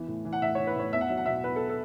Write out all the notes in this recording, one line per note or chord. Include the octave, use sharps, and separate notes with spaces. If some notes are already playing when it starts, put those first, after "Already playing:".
Already playing: E2 E3
A2
E3
F#5
A2 E5
C#5
E3
B4
A2 C#5
E2 E5
F#5
F#3 E5
F#5
B2 E5
E2 B4
A4
A4